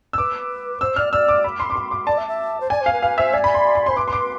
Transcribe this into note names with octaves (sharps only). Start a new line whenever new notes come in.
E6
B4 D6
C5 E6
D5 F6
D5 E6
D6
B5
C6
D6
C6
D6
D5 A5
E5
E5
C5
D5 G#5
C5
F5
B4
B4 F5
C5 E5
D5 G#5
B5
C6
B5
C5 C6
B4 D6
C6
D6